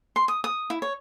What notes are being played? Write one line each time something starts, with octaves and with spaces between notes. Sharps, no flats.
C6
D#6
D#6
E4
C#5